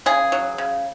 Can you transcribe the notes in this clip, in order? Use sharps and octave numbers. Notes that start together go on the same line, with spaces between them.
C#3 G#4
F#3
C#3